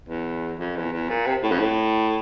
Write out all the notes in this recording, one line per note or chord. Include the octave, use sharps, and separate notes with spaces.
E2
F2
E2
E2
A#2
C3
A2
F2
A2